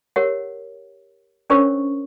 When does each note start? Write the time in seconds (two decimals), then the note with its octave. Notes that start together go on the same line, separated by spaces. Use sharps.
0.16 G4 A#4 C#5 F#5
1.50 C#4 D4 A#4 C5 C#5 C#6